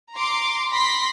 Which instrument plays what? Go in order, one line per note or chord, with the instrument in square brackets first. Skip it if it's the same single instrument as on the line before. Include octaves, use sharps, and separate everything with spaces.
[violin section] A#5 C6 D6
B5 C6 A#6 B6